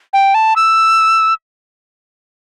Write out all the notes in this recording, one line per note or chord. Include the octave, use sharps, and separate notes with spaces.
G5
A5
E6